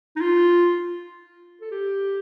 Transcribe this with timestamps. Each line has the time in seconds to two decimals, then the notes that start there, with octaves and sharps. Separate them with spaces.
0.16 D#4
0.20 F4
1.61 A4
1.71 G4